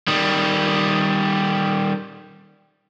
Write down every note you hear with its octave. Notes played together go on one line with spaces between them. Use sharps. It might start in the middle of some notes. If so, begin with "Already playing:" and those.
D#3 G3